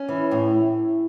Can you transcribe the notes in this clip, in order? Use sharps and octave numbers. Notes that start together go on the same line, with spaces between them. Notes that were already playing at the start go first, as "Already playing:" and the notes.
Already playing: C#4
E3
A2